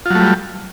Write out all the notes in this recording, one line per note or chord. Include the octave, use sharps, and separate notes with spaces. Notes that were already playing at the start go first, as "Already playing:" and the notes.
F#3 G3 A3 F4